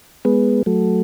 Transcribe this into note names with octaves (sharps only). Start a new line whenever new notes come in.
G#3 B3
F#3 A3